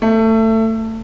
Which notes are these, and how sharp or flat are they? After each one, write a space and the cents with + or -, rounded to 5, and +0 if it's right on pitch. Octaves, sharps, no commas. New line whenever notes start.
A3 +20